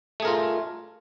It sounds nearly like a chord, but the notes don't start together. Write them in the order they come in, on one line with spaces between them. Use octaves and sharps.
A3 G#4 A#4 F4